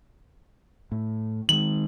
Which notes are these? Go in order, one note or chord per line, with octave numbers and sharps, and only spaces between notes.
A2
D#3 G#3 F#7